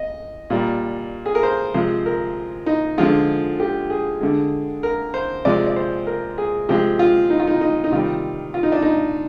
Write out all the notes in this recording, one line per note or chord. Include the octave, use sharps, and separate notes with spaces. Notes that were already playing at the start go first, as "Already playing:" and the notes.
Already playing: D#5
A#2 G3
G#4
A#4
C5
C3 F3 G#3 C5
A#4
D#4
D3 F3 G#3 F4
G4
G#4
D3 G#3
A#4
C5
C3 F3 G#3 D5
D5
C5
A#4
G#4
C3 F3 G#3 G4
F4
D#4
F4
D#4
D#4
D#4
C3 D#3 G3 F4
F4
D#4
D4
D#4